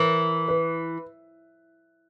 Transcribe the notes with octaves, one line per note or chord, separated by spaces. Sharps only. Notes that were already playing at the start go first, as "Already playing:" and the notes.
Already playing: E3 A#4
B4